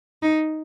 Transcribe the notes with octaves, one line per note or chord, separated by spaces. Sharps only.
D#4